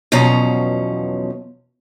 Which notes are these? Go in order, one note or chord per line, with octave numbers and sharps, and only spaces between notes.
E2 B2 F3 F#3 C#4 A#5